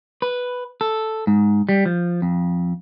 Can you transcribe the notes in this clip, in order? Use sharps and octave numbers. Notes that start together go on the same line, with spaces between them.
B4
A4
G#2
G3
F3
F2